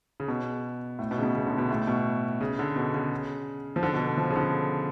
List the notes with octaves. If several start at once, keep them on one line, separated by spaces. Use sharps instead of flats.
C#3
B2
A2
B2
C#3
B2
C#3
D3
B2
A2
B2
C#3
D3
B2
C#3
F3
D3
B2
F3
C#3
D3